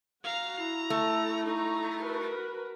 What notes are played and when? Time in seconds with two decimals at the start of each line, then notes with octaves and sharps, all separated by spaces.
0.24 F#4 F5 A#5
0.58 E4 A#5
0.90 A3
1.45 D#4 A#5
2.02 F#4 A#4 B4